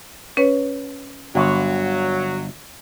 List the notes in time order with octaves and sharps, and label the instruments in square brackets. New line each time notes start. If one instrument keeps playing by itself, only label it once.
[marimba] C#4 B4 C#5
[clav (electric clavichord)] G1 [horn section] F#3